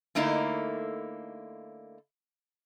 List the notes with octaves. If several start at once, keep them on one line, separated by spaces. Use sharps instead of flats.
D3 A3 A#3 D#4 E4